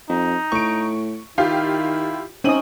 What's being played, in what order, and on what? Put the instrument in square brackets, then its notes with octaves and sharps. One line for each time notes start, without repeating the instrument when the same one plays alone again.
[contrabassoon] F2 [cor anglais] D#4
[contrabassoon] A2 [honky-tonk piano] C#6 D7
[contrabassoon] D#3 [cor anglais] E4 [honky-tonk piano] F4 G4 F5
[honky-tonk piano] C4 D#7 F#7 [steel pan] C#4 D#4 D#6